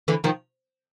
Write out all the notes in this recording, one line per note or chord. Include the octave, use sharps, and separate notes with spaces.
D3 E3
D#3 F3